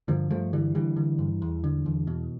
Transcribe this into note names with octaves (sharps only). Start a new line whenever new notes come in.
G2 D3 F3
G2 F3 A3
D3 E3 G3
D3 E3 G3
D3
G2
E2
D3
E2
B2